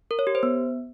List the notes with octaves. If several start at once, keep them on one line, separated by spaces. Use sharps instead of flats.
A#4
C#5
G4
C5
B3